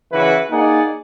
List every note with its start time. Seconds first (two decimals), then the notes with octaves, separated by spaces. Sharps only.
0.13 C#3 E3 E4 F#4 B4
0.51 A#3 D#4 G#4 D5 F#5